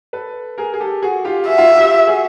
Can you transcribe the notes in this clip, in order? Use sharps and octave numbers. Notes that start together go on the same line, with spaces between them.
A4 B4
G#4 A#4
G#4
G4 A4
F#4 G#4
F4 G4
F#4 G#4 E5
F4
F#4
F4 G4
F#4 G#4